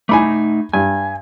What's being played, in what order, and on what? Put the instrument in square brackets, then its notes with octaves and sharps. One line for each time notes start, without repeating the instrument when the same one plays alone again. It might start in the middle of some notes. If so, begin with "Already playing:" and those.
[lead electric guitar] A3 D#4 [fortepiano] G#5 B5 D6
[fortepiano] G2 [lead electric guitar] G#5